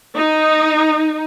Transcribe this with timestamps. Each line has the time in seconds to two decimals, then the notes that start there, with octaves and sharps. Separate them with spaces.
0.16 D#4